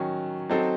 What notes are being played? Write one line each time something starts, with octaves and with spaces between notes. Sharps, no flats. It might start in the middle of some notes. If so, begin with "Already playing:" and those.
Already playing: D#3 F#3 C#4
F#3 C4 D#4 A4